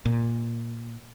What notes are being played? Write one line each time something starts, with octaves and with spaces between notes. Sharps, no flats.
A#2